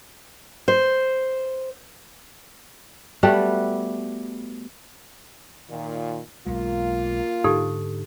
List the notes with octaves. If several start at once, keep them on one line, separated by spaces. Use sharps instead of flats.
C5
G3 A3 B3 F#4
A#2 D#3
B1 G#3 A#3 F4
G#2 D3 D#4 G4 A4